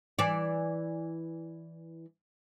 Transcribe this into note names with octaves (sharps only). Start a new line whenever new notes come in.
E3 D5